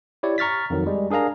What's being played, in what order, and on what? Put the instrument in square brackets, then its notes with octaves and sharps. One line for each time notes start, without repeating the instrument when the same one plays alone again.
[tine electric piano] E4 G4 C#5 D5
A#5 C#6 F6 A6 B6
F2 D#3 F#3
G3 G#3
D4 G#4 A#4 F5 A#5